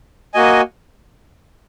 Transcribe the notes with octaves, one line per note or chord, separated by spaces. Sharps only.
A#3 F#4 D#5 G#5